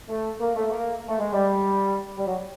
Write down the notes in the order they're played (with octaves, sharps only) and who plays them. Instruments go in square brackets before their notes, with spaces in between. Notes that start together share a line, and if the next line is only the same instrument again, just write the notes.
[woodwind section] A3
A#3
A3
A#3
A3
G#3
G3
G3
F#3